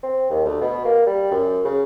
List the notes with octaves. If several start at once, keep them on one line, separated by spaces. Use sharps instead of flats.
C4
D#2
D2
B2
A#3
G3
F#2
C#3